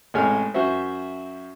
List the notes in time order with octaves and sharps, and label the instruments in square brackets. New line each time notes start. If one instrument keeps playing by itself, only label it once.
[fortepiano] A1 C3 G#3 C#5 G#5 F6
F#2 F#4 C5 E5